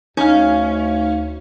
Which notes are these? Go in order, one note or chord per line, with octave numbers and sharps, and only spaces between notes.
D2 C#4 D#4 F5